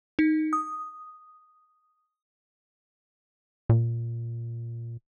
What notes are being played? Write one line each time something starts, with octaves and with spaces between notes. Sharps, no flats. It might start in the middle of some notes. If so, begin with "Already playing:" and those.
D#4
D#6
A#2